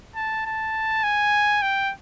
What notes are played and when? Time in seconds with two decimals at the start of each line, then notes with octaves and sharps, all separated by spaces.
0.16 A5
0.46 A5
1.03 G#5
1.62 G5